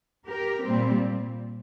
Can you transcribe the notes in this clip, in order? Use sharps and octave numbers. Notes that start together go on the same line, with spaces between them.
G4 A#4
A#2 G3 C4